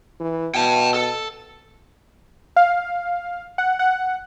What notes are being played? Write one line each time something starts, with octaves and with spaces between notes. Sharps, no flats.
E3
B2 G5 A5
A4
F5
F#5
F#5